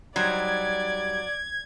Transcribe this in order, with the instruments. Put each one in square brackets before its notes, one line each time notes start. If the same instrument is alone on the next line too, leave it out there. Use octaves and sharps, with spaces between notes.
[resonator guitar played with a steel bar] F#3 [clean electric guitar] G3 D#4 C5 [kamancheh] D5 [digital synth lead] G#6